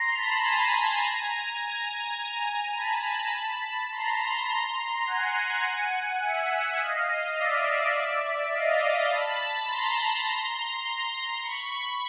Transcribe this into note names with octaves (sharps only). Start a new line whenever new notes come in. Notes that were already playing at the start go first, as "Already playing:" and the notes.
Already playing: A#5 C6
A5 B5
G#5 A#5
G#5 A#5
A5 B5
A#5 C6
F#5 G#5
E5 F#5
D#5 F5
D5 E5
D#5 F5
A5 B5
A#5 C6
A#5 C6
B5 C#6